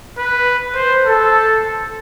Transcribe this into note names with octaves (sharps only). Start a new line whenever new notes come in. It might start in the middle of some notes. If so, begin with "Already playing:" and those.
B4
C5
A4